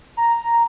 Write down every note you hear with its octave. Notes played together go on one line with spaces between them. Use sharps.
A#5